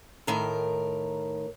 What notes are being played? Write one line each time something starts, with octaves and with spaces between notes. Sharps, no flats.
A2 D#3 A#4